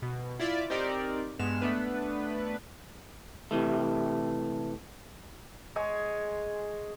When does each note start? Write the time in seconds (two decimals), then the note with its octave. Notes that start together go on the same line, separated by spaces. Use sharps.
0.02 B2
0.39 E4 F4 D5 E5
0.70 C4 D#4 G4 A#4 D5
1.39 G2 G#3 B3 F6 E7
1.62 A3 B3 D4 B4
3.51 C3 E3 A3
5.76 G#3 G#4 C#5 G#5